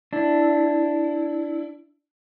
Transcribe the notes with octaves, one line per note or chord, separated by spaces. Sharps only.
D4 E4